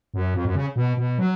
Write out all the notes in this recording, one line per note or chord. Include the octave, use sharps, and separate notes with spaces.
F#2
F2
F#2
C#3
B2
B2
F#3